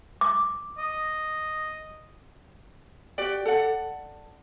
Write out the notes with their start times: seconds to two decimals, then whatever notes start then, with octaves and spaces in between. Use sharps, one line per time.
0.21 D6
0.78 D#5
3.18 F#4 G4 D5 G5
3.45 A4 D5 F#5